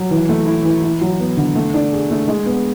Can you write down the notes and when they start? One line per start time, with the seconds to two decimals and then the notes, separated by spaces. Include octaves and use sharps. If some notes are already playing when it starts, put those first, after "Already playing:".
Already playing: F#3
0.11 E3
0.29 A3
0.46 E4
0.65 E3
0.83 E4
1.01 F#3
1.20 B3
1.37 D3
1.55 A3
1.74 D4
1.93 G#4
2.11 A3
2.28 G#3
2.46 B3